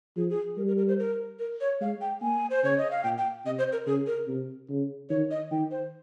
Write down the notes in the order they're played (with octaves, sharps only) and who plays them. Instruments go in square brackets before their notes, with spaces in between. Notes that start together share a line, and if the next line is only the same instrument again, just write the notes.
[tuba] F3 [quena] G#4
[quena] G#4
[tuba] G3 [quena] A#4
[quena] A#4
A#4
C5
A#4
A#4
C#5
[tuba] G#3 [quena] F5
[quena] G5
[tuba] A#3 [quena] G#5
[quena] C5
[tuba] C#3 [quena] C#5
[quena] D#5
F5
[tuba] A#2 [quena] G5
[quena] G5
[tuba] C3 [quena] D#5
[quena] C5
A#4
[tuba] C#3 [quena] G#4
[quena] A#4
[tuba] C3
C#3
[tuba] D#3 [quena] C#5
[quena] D#5
[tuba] D#3 [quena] G5
[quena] C5